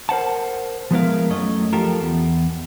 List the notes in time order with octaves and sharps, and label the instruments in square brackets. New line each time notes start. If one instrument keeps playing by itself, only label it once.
[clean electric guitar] A#4 C5 F#5 A5
F3 G#3 B3 E4 A#4 F5
F#2 A3 C#4 D#5
F3 F4 G4 A4 A#4
E2